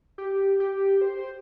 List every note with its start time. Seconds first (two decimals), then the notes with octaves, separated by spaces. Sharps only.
0.18 G4
0.60 G4
1.01 C5